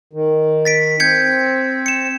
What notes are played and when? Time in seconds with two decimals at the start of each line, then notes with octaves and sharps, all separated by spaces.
0.13 D#3
0.65 A6 B6 D7
1.00 C4 G6 G#6 C#7
1.86 C#7 E7